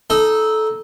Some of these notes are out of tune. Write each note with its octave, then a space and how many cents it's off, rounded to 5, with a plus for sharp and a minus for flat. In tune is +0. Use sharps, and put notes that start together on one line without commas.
D#4 +0 A4 -15